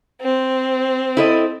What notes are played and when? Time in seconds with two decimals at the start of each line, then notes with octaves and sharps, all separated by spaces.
0.21 C4
1.17 E4 A4 D#5